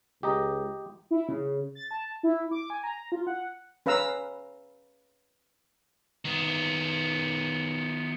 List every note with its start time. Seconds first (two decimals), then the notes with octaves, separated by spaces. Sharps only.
0.23 C#2 G4 D#5 A#5
1.11 E4
1.29 C#3
1.75 A6
1.91 A5
2.23 E4
2.51 D6
2.70 G#5
2.83 A#5
3.12 F4
3.27 F#5
3.86 C#4 B4 F5 A#5 E6
6.25 D#3 B3